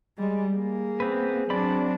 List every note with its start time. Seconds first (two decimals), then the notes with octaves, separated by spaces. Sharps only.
0.18 G3 G#3
0.55 A#3 G#4
1.00 B3 C4 B4
1.50 F#3 C4 D4 D5 B5